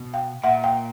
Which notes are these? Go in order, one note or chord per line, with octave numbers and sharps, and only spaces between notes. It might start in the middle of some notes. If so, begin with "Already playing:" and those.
Already playing: B2
F5 G5
A#2 E5 F#5
F5 G5